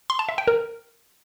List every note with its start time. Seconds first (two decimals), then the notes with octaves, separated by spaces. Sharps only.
0.10 C6
0.19 A5
0.29 E5
0.38 G5
0.48 A#4